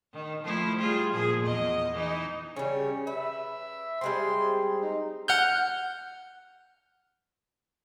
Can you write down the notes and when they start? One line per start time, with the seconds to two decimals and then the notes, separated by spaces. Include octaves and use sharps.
0.13 D#3
0.43 F3 A3 E4
0.78 G3 F4 G#4
1.12 A#2 F3 G#4
1.43 E2 D#5
1.94 E3 D#4
2.56 C#3 G3 C#4
3.07 B4 E5
4.01 G3 G#3 C4 C6
4.82 D#4
5.28 F#5 F6 G6